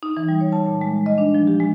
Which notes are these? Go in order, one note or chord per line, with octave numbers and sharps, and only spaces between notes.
D#4
E3
G3
C#5
A5
A#2
G#3
D#5
D4
F3
G4
G#3